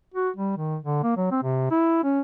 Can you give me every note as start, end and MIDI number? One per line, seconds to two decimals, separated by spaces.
0.14 0.30 66
0.36 0.54 55
0.58 0.77 51
0.82 1.02 50
1.03 1.15 58
1.17 1.30 54
1.31 1.39 60
1.43 1.70 48
1.71 2.02 64
2.04 2.21 61